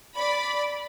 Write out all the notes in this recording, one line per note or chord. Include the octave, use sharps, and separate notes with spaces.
D5 B5